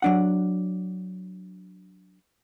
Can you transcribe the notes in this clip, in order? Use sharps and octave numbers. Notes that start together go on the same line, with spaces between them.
F#3 D4 F#5